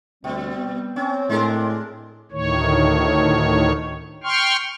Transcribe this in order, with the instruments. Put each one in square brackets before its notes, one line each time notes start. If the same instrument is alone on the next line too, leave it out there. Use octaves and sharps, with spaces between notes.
[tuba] D2 [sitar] B2 [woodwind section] G3 C4
[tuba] B3
[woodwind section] C4 [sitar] C#4
[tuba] A2 [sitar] G#3 D4 A#4
[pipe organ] D2 A2 D#3 C#5
G5 C6 C#6 F6